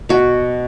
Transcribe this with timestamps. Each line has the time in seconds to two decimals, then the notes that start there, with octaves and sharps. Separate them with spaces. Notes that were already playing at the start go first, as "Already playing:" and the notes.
0.09 B2 F#4